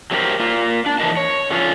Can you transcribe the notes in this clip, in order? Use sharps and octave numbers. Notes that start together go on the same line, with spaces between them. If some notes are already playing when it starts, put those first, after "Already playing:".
F#3 B3 C#4 G4 A#4 C5
A#3 F4
D4
E3 F3 A#4 D#5 A5
C#5
D3 F3 C#4 F4